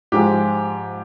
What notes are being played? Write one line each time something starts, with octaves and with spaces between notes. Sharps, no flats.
G#2 F3 G#3 G4